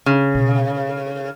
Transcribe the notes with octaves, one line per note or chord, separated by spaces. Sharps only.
C#3
B2